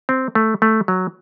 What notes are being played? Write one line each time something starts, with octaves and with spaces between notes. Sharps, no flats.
C4
A3
A3
F#3